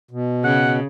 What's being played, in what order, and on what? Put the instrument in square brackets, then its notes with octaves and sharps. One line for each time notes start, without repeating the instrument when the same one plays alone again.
[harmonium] B2
[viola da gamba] C#3 [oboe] F#5